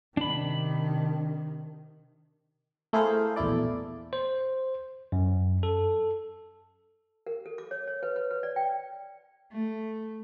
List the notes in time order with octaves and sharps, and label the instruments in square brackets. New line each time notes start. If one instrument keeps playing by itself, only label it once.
[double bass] C3 D#3 [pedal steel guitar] D4 B5
[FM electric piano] A3 E4 G#4 A#4 C5 F5
A#1 E2 B2 A3 E4 D5
[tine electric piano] C5
F#2
A4
[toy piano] A#4
A4
D6
C#5
C#5
B4
B4
B4
D5
G5
[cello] A3